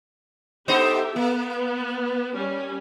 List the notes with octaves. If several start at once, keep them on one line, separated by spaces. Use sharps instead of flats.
B3 D#4 G4 A4 C5 E5
A#3 B3
G3 C#4